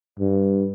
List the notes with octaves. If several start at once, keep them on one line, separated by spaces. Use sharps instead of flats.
G2